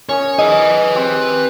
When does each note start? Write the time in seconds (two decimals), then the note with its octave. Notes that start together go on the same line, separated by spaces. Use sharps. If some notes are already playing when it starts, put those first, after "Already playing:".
0.09 C#4 A#4 C#5 D#6
0.39 G#4 B4 D#5 G#5
0.95 C4 G4